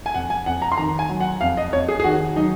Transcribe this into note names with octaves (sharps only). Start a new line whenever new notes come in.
G#5
F2 F#5
G#5
F2 F#5
A#5
C6
D#3 A#5
G#5
F#3
F#5
F2 F5
D#5
F2 C#5
G#4
G#4
D#3 F#4
F#3 D#4